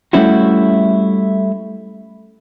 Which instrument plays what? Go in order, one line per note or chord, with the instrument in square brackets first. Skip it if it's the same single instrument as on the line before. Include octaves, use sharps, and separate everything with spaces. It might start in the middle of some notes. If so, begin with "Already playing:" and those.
[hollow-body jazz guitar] G3 A3 C#4 E4 F#4